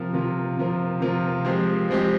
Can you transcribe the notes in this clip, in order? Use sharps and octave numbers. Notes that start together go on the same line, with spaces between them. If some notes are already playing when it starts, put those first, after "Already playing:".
Already playing: C3 F3 A#3 F4
C3 F3 A#3 F4
C3 F3 A#3 F4
C3 F3 A#3 F4
F3 G#3 C4 G4
F3 G#3 C4 G4